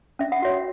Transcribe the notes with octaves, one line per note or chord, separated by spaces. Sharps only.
C#4 E5
F#5
F#4 C#5 E5